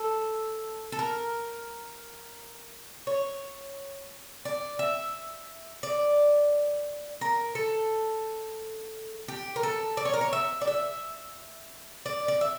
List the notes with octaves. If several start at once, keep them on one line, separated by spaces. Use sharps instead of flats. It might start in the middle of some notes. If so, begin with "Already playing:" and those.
Already playing: A4
A4
A#4
C#5
D5
E5
D5
A#4
A4
G4
A#4
A4
D5
C#5
A#4
C#5
E5
D5
E5
D5
D5
E5